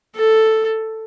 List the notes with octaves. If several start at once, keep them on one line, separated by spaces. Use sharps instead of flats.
A4